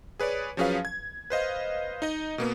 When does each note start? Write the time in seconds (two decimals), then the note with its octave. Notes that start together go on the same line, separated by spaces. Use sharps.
0.20 G#4 B4 C#5 D5
0.57 F3 F#3 C#4 G#4 B4 F5
0.85 G#6
1.30 B4 C5 D#5 F5
2.02 D#4 D#5
2.38 B2 A#3 B3